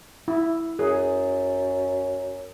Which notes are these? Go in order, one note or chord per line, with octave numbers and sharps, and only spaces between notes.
E4
F#2 G#4